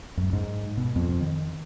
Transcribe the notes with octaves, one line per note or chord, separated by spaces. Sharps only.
F#2
G#2
B2
F2
D#3